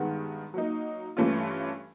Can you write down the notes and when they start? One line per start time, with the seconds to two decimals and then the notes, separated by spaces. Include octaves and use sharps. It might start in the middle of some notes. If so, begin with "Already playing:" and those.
Already playing: G2 D#3 G#3 B3
0.54 F#3 A#3 D#4
1.17 G2 E3 A3 C#4 F4